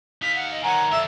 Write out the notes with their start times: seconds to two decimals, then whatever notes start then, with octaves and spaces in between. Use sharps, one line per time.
0.22 D#4 F5 B6
0.35 F#5
0.50 D#5
0.64 D#3 F#3 C#5 F#5 G#5 A#5
0.91 F2 D3 E5